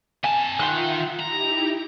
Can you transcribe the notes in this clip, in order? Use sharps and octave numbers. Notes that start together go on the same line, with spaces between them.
C3 G#5 A5
D#3 F4 E5 F#5 G5 C6 F#6
D#4 E4 G4 A#5